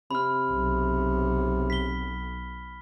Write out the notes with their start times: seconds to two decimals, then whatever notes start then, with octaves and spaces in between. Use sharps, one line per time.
0.11 C3 B5 F6
0.51 B1
1.70 B6 G7